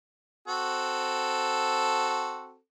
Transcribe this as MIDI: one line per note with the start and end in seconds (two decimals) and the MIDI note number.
0.48 2.57 60
0.48 2.57 66
0.48 2.57 69